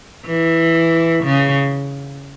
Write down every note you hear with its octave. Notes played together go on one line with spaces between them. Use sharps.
E3
C#3